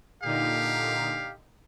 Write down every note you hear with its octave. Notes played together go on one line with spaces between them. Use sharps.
A#2 D3 D#4 G4 F5